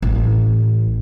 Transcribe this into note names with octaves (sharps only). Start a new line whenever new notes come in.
A1